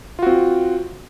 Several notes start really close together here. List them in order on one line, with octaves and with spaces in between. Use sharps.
F4 F#4 C4